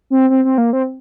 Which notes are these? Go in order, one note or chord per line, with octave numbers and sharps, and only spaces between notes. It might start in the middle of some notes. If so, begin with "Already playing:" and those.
C4
C4
C4
A#3
C4